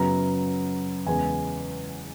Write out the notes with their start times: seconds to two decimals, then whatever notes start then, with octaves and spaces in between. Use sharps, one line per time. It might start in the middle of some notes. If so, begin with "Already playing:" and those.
Already playing: F#2 C#3 F#3 B3 A#5
1.06 E2 C#3 G#3 B3 G#5